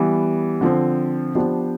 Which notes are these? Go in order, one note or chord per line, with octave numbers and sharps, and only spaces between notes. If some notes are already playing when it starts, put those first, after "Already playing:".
Already playing: E3 G3 B3
D3 F3 C4
F3 B3 D4 G4 C5